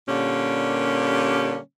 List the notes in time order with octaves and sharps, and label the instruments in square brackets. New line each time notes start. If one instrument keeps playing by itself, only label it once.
[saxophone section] A#2 D3 G3 A#3 C#4 G4